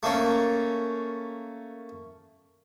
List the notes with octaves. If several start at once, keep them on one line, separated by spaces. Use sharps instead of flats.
A3 A#3 C#4